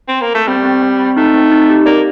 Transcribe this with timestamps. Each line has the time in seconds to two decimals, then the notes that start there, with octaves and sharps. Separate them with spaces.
0.08 C4
0.22 A#3
0.35 A3
0.48 G3 C4
0.65 C4
0.82 C4
0.99 C4
1.17 A3 D#4
1.34 C4
1.51 D#4
1.69 G4
1.86 A#3 D5